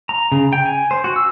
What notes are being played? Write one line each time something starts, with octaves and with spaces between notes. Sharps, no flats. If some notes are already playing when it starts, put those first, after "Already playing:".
A#5
C#3
G5
G#5
C5
F#4
E6